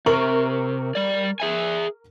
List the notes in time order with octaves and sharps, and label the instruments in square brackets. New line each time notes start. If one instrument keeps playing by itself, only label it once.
[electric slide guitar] C3 [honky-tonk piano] A#4 C#6 F#7
[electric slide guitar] G3 D5
G#4 E5 G#5